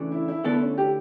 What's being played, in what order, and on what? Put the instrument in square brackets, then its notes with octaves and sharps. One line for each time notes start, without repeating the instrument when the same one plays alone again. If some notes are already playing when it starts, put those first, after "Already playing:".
Already playing: [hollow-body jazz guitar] C#3 E3 A3 D4
[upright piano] E4
E4
[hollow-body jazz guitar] D2 D3 A3 E4 A4 [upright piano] B3
[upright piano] C#4
G4